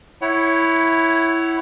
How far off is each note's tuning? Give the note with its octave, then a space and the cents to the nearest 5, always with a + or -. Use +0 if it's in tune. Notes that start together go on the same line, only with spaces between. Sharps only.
E4 +0 C#5 +0 F#5 +30